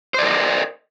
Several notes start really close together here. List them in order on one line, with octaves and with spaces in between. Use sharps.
C5 D5 A#4 D#5